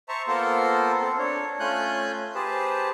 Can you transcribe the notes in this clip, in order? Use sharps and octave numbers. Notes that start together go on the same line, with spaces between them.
C5 E5 A5 A#5 C#6
A#3 B3 F4 A4 A#4 C5
C4 A4
D4 C#5
A3 C#4 F4 G#5 F#6 G6
G4 G#4 B4 C5 A5